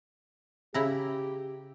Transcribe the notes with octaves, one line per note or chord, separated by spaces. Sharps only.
C#3 E4 G4 A#5